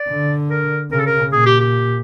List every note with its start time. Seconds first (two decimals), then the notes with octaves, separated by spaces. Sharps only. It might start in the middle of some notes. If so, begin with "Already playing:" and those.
Already playing: D5
0.09 D3
0.50 A#4
0.91 C#3 A#4
0.99 A4
1.06 A#4
1.32 A#2 G#4
1.46 G4
1.60 G4